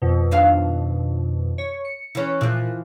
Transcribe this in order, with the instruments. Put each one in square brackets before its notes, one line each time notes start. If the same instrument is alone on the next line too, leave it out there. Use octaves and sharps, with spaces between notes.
[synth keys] F2 B2
[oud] D#2 D4 F5
[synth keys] C#5
C#7
[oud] E3 C#4
[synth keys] A#2 F#6 [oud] E3 F3